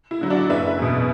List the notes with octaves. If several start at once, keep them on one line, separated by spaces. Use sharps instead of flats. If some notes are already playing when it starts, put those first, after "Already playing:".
E4
D3 F#3
D4 F#4
F#1 B4 E5
E2 B2